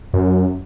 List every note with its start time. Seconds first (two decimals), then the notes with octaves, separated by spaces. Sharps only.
0.14 F#2